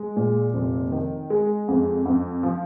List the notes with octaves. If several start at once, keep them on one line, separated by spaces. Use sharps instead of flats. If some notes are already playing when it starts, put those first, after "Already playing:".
Already playing: G#3
A#2
F1
D#3
G#3
F2
F2
F3